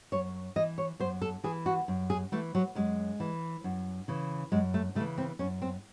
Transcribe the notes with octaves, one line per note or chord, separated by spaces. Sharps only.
F#2 C#5
E3 D#5
C#5
F#2 C5
A4
E3 G#4
F#4
F#2
G#4
E3 A3
F#3
F#2 G#3
E3
F#2
C#3 E3
F#2 G#3
A3
C#3 E3 A3
C4
F#2 C#4
C4